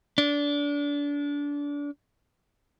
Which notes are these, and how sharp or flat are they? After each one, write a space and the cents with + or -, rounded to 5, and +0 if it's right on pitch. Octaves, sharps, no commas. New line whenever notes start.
D4 -25